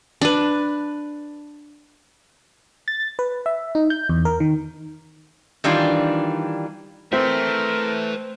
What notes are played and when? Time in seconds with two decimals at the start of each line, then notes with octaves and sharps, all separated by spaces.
0.21 D4 B4
2.88 A6
3.19 B4
3.46 E5
3.75 D#4
3.90 G6
4.09 E2
4.25 A#4
4.40 D#3
5.64 D#3 E3 G3 D4 F4
7.13 A3 C4 A#4 B4 E5